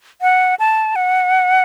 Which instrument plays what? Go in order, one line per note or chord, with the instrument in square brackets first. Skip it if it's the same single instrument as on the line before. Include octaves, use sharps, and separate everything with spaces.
[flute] F#5
A5
F#5